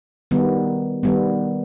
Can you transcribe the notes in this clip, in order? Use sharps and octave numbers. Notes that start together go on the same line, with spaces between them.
D#3 G3 B3
D#3 G3 B3